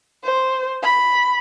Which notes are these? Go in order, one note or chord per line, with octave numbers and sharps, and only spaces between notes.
C5
B5